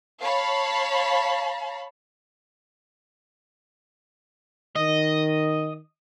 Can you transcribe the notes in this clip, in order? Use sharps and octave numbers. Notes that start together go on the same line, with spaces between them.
C#5 F5 A5 B5
D#3 D#5